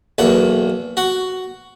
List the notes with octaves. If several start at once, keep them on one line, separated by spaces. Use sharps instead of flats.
B1 E2 A#3 F#5
F#4 F#5